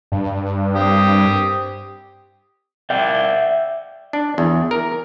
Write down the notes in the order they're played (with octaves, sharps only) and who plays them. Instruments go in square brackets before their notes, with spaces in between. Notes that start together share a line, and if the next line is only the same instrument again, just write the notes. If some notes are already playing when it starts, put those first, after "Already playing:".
[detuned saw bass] G2
[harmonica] C4 G4 D#6
[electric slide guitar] D5 E5 G5
[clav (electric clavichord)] D4
E2
A#4